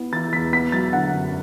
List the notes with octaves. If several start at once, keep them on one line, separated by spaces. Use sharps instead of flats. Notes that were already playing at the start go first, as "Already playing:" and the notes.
Already playing: B3 E4
E3 A6
E2 B6
B3 B6
F#3 A6
D3 F#5
F#2